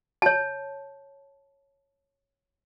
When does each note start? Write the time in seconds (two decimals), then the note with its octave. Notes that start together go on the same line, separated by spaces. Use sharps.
0.22 C#5 A5